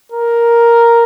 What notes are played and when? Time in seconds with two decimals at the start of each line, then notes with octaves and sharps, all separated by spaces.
0.12 A#4